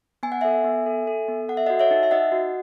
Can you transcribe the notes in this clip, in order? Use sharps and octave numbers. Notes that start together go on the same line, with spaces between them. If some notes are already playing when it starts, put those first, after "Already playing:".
B3 G#5
F#5
A4 E5 G#5
B3
A4
A4
B3
A4 F#5
E5
F#4 D#5 F#5
C#5 E5
D#4
E5
D#4 D#5 F#5
F#4